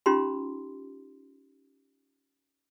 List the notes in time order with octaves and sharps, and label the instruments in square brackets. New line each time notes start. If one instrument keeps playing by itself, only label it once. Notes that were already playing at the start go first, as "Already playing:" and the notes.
[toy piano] C#4 D#4 F4 G4 A#5 C6